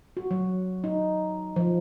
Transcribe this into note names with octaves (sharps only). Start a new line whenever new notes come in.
F#4
F#3
D#4
F3